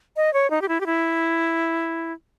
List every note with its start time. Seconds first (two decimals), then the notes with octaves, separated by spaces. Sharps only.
0.16 D#5
0.33 C#5
0.51 D#4
0.62 G4
0.68 E4
0.80 G4
0.86 E4